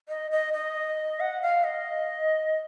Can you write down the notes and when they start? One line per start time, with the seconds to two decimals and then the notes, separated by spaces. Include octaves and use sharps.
0.09 D#5
0.31 D#5
0.53 D#5
1.20 F#5
1.42 F5
1.64 D#5